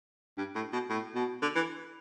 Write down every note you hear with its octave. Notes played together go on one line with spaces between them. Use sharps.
G2
A2
B2
A2
B2
D3
E3